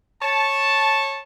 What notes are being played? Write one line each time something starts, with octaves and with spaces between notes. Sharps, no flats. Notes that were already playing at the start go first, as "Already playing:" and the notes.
C#5 A5